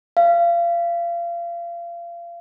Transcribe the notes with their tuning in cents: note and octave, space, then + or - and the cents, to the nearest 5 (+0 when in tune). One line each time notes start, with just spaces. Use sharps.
F5 -30